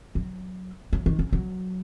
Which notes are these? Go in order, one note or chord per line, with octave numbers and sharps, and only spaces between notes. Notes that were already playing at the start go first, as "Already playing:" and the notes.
F#3
F#3
D#3
C#3
F#3